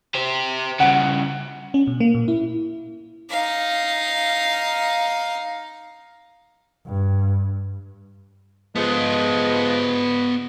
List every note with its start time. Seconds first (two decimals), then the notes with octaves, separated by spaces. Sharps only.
0.14 G4 C5
0.80 G2 C#3 F#5
1.74 C#4
1.87 B2
2.00 A#3
2.14 A#2
2.28 E4
3.31 D#4 F5
6.86 G2
8.76 F3 G#3 B3 F4